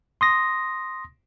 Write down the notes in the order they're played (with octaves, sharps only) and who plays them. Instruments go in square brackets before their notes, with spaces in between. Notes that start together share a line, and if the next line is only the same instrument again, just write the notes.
[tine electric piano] C6 D#6 A#6